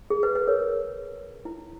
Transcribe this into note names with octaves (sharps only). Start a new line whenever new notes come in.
G#4
B4
B4
A#4 C#5
E4